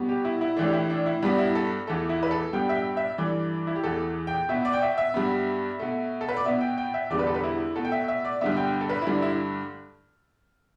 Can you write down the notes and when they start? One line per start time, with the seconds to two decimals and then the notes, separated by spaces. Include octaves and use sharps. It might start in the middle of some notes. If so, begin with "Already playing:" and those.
Already playing: B2 G3 B3
0.09 G4
0.25 E4
0.41 E4
0.57 A2 E3 A3 D4
0.67 G4
0.73 E4
0.90 D4
1.06 E4
1.22 G2 G3 B3 D4
1.38 E4
1.55 A4
1.87 E2 E3 A3 A4
2.09 E4
2.23 B4
2.31 A4
2.53 G2 G3 B3 G5
2.69 E5
2.75 G5
2.97 E5
3.18 G2 E3 A3 D5
3.67 E4
3.76 G4
3.83 E2 E3 A3 A4
4.27 G5
4.49 B2 B3 E5
4.65 D5
4.73 G5
4.82 E5
4.98 E5
5.14 G2 G3 B3
5.79 B2 A3
6.21 A4
6.29 B4
6.37 D5
6.45 B2 B3 E5
6.61 G5
6.78 G5
6.94 E5
7.10 E2 D3 G3 B3 D5
7.19 B4
7.27 A4
7.34 B4
7.44 E4
7.76 B2 A3 A4
7.85 G5
7.92 E5
8.08 E5
8.25 D5
8.41 G2 D3 B3 E5
8.57 G5
8.81 A4
8.89 B4
9.02 E4
9.06 G2 D3 A3 D4
9.22 E4